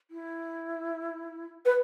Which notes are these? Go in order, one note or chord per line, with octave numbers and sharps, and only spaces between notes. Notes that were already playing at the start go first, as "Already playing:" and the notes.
E4
B4